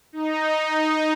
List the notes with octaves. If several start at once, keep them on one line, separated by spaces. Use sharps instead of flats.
D#4